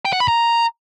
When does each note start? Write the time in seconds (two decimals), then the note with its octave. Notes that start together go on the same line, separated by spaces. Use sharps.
0.05 G5
0.13 F#5
0.20 B5
0.28 A#5